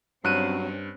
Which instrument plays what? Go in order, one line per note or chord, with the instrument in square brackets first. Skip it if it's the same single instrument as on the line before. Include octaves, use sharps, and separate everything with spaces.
[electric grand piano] G2 [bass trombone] F#3 [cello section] C4 C#4 [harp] F#6 D#7